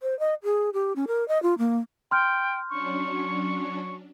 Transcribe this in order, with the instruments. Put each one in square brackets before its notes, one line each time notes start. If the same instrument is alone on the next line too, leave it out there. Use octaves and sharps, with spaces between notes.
[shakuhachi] C5
D#5
G#4
G4
C#4
A#4
D#5
F4
A#3
[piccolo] G5 [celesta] C6 F6 G6
[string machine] F#3 C#4 D4 [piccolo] C#6